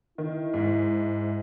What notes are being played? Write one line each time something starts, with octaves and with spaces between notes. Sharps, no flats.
D#3 E4
G#2